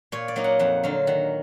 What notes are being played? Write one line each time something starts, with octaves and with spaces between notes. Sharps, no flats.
A#2 C#5
D5
F#3 A#3 D#4
F#5
F2 F#5
D3 F#3 F5
D#3 F#5